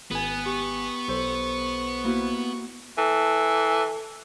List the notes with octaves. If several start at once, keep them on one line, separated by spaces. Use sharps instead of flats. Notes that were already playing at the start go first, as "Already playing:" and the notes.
G#1 B3 G#5
G4 C#6
B1 A4 C5
A#3 E4 F#4
E3 A4